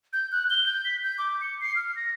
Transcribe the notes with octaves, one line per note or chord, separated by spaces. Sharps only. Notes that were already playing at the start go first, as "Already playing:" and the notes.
G6
F#6
G7
G6
B6
G6
D6
C#7
C7
F6
A#6